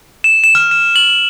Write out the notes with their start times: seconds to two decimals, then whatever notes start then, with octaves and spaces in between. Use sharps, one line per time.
0.24 E7
0.44 E7
0.55 F6
0.71 E7
0.96 F#7